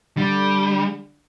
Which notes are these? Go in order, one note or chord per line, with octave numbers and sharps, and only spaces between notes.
D3 G3